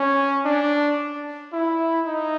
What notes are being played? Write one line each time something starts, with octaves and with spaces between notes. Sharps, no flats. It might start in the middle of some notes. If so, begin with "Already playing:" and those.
Already playing: C#4
D4
E4
D#4